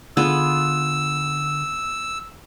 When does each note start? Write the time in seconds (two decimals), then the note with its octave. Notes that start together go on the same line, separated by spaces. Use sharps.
0.17 D3 B3 F4 G#4 E6